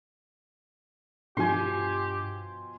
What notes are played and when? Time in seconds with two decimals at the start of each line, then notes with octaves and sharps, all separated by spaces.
1.37 G2 B2 F3 G4 G#5 C6